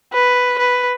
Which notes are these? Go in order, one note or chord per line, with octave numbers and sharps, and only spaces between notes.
B4
B4